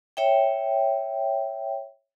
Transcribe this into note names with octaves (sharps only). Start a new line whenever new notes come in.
C#5 E5 G5